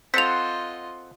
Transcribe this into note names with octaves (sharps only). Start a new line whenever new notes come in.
C4 F4 A4 C5 D#5 F#5 B6 F7